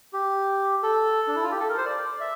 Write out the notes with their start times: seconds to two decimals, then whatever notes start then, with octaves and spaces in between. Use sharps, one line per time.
0.13 G4
0.83 A4
1.27 D4
1.35 E4
1.43 F4
1.51 G4
1.60 A4
1.69 A#4
1.77 C5
1.85 D5
2.20 E5